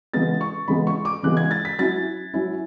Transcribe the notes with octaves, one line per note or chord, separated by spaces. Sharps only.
C#3 E3 G#3 B3 A6
C#6
C#3 E3 G#3 B3 B5
C#6
D6
C#3 E3 G#3 B3 F#6
G#6
A6
B6
F#3 C#4 E4 A6
F#3 C#4 E4